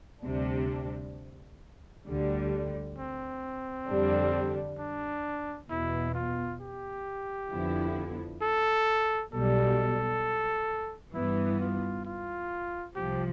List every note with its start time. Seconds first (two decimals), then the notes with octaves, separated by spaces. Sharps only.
0.25 D2 C3 G3 D4
2.07 D2 D3 G3
2.98 C4
3.88 F2 D3 G3 D4
4.78 D4
5.69 E2 B2 B3 E4
6.14 F4
6.61 G4
7.51 F2 D3 F3 B3 E4
8.42 A4
9.33 B1 B2 G3 A4
11.14 G2 E3 B3 E4
11.60 F4
12.05 F4
12.95 C2 C3 F3 G4